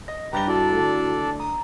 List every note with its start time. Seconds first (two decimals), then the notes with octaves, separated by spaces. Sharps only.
0.08 D#5 A#6
0.33 G2 G4 B4 A#5 A6 G7
0.47 D4 E4 F#4 A4 D5 A5
0.72 D3 A3
1.40 A#5 D#6